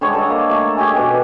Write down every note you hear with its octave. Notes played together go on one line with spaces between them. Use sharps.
D3 G3 G#3 C#5
A4 D#5
A#3
A3 A4
G4 G#4 D#5 G#5
B2 D4 G5